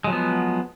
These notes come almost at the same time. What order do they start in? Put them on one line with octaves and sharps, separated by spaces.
G#3 F#3 F3 B3